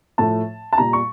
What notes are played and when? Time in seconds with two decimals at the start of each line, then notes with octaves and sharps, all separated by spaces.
0.18 A2 F3 A3 A5
0.73 A5
0.78 A#2 G3 A#5
0.93 C#6